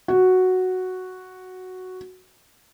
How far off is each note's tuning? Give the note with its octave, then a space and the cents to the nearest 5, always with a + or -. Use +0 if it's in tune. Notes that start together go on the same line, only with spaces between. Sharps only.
F#4 +0